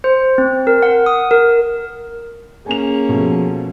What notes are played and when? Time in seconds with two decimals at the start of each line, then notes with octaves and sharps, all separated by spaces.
0.04 C5
0.38 C4
0.67 A#4
0.83 F#5
1.06 D#6
1.31 A#4
2.66 A#3 C#4 G#4 G#5 F7
3.09 B2 F3 A3